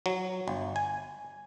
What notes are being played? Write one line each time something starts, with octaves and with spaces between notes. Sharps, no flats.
F#3
G1
G#5